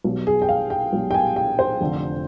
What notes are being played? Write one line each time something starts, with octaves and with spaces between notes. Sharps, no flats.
B1 B2 G3
G#4
G5
F5
G5
B1 B2 G3
G5
G#5
G5
C5
F1 F2 D3